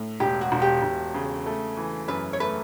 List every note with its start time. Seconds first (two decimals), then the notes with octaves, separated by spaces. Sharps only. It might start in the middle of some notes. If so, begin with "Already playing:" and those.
Already playing: A2
0.20 E1 G4
0.41 F#4
0.52 E1
0.62 G4
0.82 E1
1.14 C#3
1.46 A3
1.77 E3
2.08 F#2 B4
2.33 C#5
2.40 A3 B4